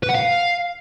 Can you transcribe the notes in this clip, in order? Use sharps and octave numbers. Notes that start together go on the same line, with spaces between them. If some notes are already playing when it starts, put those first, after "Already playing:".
B4
F#5
F5